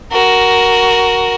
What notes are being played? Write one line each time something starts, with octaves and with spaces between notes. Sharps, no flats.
F#4 A#4